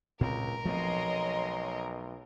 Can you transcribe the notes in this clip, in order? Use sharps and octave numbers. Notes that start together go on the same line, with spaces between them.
C#2 A#2 C4 A#4
B1 F3 A3 C4 C#5 D#5 C6